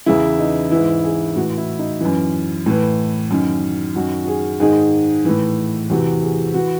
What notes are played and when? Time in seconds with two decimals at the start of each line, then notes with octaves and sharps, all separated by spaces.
0.06 E2 C#3 E3 E4
0.39 D#4
0.71 G#2 E3 E4
1.04 G#4
1.36 A2 E3 F#4
1.57 E4
1.79 D#4
2.01 F#2 E3
2.66 A2 E3
3.31 F#2 D#3
3.95 F#2 D#3 F#4
4.24 F#4
4.27 G#4
4.60 G#2 D#3 G#4
5.25 A2 E3
5.90 E2 C3 E3 F#4
6.22 G#4
6.54 E3 F#4